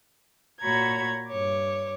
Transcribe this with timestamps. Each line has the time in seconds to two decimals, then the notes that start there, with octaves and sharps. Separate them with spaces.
0.62 A#2 F#4 C#5 A#5 B5 G#6
1.30 G2 C#5 D6